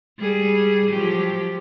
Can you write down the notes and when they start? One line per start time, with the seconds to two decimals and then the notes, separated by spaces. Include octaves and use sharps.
0.20 G3 G#4
0.92 F3 F#3 G4